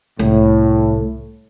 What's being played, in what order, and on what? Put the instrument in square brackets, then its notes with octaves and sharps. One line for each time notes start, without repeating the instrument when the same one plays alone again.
[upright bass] C2 [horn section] A2